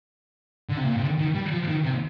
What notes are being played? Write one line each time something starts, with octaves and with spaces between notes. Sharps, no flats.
D3
C3
A#2
C3
D3
D#3
G3
F3
D#3
C3